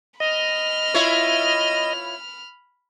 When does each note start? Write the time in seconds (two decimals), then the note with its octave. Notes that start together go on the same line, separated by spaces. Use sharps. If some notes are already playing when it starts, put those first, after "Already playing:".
0.20 D#5 B5 F6
0.94 E4 F4 C#5